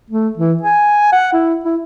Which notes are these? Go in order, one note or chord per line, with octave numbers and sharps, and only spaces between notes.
A3
E3
G#5
F#5
E4
E4